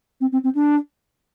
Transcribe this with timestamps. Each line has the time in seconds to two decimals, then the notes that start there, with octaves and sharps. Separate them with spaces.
0.21 C4
0.32 C4
0.44 C4
0.55 D4